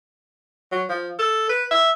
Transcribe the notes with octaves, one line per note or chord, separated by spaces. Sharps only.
F#3
F3
A4
B4
E5